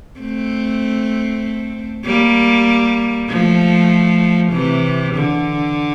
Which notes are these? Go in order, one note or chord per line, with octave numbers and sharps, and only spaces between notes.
A3 C4
G3 A#3
F3 A3
C3 E3
D3